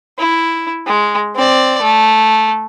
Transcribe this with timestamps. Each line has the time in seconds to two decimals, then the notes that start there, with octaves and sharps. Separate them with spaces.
0.18 E4
0.87 G#3
1.36 C4 D5
1.82 A3